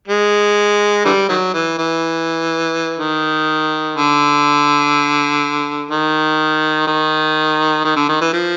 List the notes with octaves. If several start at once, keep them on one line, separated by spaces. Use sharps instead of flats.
G#3
D3 E3 G3
D#3 F#3
E3
E3
D#3
D3
D#3
D#3
D#3
D3
D#3
E3
F3